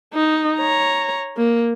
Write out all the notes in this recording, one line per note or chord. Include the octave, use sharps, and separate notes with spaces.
D#4
C#5 A#5
A#3